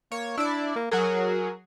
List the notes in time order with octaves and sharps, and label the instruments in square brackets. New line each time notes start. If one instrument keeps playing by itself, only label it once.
[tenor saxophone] A#3 [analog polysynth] C#5
[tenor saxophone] D4 [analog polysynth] E4 D5
[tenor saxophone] A#3
[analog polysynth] F#3 F#4 G#4 [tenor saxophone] A#4